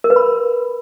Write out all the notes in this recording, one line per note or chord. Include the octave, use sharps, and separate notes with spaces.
A#4
B4
B5